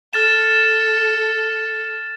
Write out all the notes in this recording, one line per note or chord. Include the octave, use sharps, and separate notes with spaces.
A4 F6 A6 E7